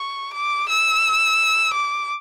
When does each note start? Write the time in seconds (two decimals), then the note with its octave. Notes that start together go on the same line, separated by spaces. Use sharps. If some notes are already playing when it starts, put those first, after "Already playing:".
Already playing: C#6
0.34 D6
0.69 E6
1.74 D6